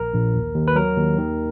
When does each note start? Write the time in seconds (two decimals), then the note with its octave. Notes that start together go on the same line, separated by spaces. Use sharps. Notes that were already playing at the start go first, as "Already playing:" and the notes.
Already playing: A#1 A#4
0.13 A#1
0.34 D#2
0.55 D#2
0.68 B4
0.75 F#3 A#4
0.97 D#2
1.18 D#3